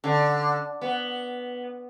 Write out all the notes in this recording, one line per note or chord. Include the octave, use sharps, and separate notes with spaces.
D3
B3